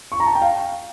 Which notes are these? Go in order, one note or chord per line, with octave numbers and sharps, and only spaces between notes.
C#6
A#5
A5
G5
F5